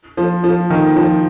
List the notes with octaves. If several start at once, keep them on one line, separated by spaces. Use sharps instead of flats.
F3
F3
D#3
F3